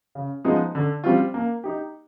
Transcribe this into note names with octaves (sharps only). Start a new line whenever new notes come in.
C#3
F3 G#3 B3 D#4
D3
G3 C4 F4
A#3
D#4 G4